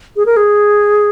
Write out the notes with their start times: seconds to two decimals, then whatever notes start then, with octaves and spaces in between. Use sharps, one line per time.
0.16 G#4
0.26 A#4
0.37 G#4